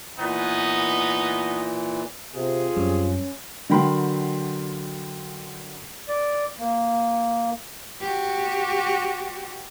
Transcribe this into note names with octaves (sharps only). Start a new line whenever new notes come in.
A#2 E3 B3 D#4
C3 C4 F4 G#4
F#2 G3 C#4
D3 F#3 A#4 G5 B5 C6
D5
A#3
F#4 G4